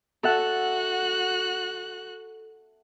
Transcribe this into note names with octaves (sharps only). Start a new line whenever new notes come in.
F#4 A4 E5 F#5 F#6